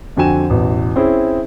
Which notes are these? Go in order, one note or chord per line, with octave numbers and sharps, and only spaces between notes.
F2 D3 F#4 G5 G#5 E7
A1 E2 B2
C4 C#4 E4 G#4